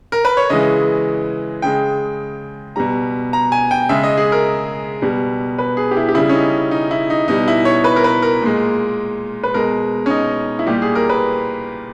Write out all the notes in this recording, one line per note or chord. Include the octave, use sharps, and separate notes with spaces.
A#4
B4
C#5
C#3 E3 G#3 D#5
C#3 G#3 G5
B2 G3 A#5
A#5
G#5
G5
C#3 G#3 E5
D#5
G#4
A#4
B2 G3
B4
G#4
G4
E4
G4
C#3 G3 E4
C#4
D#4
D#4
E4
D#4
B2 G3 D#4
E4
C#5
B4
A#4
B4
A#4
A#2 G#3
B4
B2 G#3 A#4
C#4
D#4
E4
A#2 G3 G4
G#4
A#4
B4